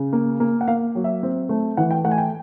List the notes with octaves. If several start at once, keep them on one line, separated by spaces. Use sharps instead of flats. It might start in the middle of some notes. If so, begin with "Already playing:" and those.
Already playing: C#3
A#3
A#3
F#5
A#3 F5
F#3
E5
C4
A3
E3 F#5
G5
A3 F#5
G#5
G5